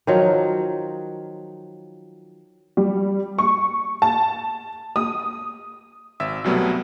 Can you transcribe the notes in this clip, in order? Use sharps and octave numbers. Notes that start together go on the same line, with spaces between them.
D#3 F3 F#3 F4
G3
C#6
A5
D#6
G#1 E5 E6
C2 B2 F#3 G3 A3 B3